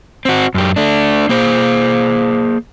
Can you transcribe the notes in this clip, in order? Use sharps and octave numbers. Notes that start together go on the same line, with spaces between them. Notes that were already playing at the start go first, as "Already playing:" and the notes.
C4 F#4
F#2 G4
A3 D4
A#3 G#4 C5